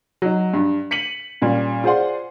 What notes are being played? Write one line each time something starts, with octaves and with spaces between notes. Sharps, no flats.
F#3 D#4
G2
B6 C#7 D#7 F#7
A#2 G3 C#4
F4 G#4 C5 D5 F#5 C6